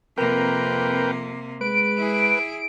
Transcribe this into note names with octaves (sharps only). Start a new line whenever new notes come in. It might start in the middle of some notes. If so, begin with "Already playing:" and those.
F2 C3 A#3 A#4 B4 G5
G#3 B4 D7
E4 G#4